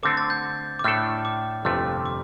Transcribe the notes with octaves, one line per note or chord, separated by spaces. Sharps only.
D3 A3 C4 A4 D6
A6
G6
D6
A2 A3 D4 A4 F6
D6
G1 F2 C3 A3 F6
D6